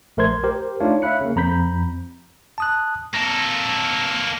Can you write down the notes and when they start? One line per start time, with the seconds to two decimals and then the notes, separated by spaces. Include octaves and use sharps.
0.17 A#1 A3 A#4 C5 C6 G#6
0.44 G4 A#4 C5
0.80 A3 D4 D#4 F4 C#5 F5
1.02 C#5 E5 F5 B5 F#6 C#7
1.21 C#3 A#3
1.36 F2 A#5 B5 G6 B6
2.58 A5 D#6 F#6
3.14 A#3 A4 A#6